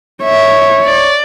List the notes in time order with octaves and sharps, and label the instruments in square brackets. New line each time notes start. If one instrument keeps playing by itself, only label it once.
[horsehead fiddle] C#5 [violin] E5
[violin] D5